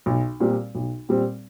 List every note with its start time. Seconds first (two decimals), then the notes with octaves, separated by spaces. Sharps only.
0.06 B1
0.40 A#2 G3 C4
0.75 B1
1.09 A#2 G3 C4